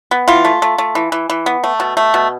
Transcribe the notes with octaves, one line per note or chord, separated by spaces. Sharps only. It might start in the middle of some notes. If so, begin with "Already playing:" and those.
B3
E3 F4
A3
A3
A3
E3
E3
E3
B3
A3
B2
A3
B2